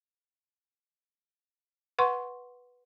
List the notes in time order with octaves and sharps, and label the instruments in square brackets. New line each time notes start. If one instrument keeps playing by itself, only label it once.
[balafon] B4 F#5 C6 C#6